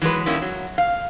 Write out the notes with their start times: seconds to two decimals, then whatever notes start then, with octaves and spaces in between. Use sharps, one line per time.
0.02 E3 F#3 G#3 B4
0.26 D#3 G3 A#3 C#4 E4
0.42 F#3
0.78 F5